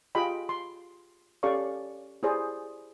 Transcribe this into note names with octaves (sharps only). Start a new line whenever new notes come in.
F4 G4 G#4 D#5 G5 B5
C6
C#4 G4 A4 D5 F5 C#6
E4 G4 G#4 C5 D5